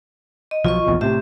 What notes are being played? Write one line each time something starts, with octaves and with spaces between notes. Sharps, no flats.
D#5
B1 F3 F#3 F4 D#5 C#6
F1 A#1 E2
A2 C3 G4 E5